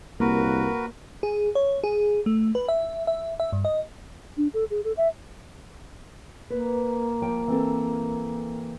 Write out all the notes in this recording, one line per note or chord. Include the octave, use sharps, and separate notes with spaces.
C2 A#3 F#4 A#4 B4
G#4
C#5
G#4
A3
B4
E5
E5
E5
G2
D#5
D4
A4
G#4
A4
E5
A#3 B4
F3 G5
E3 C4 A4